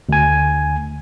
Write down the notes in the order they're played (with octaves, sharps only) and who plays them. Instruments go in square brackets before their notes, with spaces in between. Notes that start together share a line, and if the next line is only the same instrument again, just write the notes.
[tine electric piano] D2 G#5